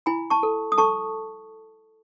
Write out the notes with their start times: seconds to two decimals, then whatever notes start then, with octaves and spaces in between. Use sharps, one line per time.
0.06 E4 G#5 B5
0.30 A5 C#6
0.43 A4
0.72 D#6
0.78 A4 A5 C#6